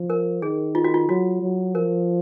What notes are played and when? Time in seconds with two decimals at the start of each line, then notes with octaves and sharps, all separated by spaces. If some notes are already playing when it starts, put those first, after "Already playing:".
Already playing: F3
0.10 A#4
0.42 D#3 G#4
0.75 F4
0.84 F#4
0.94 F4
1.09 F#3 F#4
1.42 F#3
1.75 F3 A#4